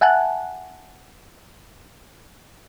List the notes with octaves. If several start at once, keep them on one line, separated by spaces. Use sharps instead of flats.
E5 F#5 G#5 A5 F#6